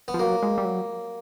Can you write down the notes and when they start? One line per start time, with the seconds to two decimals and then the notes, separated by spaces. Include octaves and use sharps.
0.08 B3
0.14 F3
0.20 F#3 A#3
0.43 G#3
0.58 G3
0.65 F#3